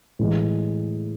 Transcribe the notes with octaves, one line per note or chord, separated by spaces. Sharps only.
A2 E3 G#3